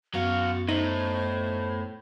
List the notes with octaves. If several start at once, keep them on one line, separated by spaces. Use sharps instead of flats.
F#2 F#3 B3 F#4 F5 C#6
A2 D#4 C5